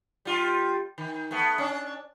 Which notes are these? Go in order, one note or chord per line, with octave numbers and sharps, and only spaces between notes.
G3 F4
D#3
A3 B3
C#4 D4